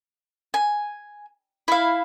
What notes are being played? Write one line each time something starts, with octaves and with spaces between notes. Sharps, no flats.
G#5
E4 F5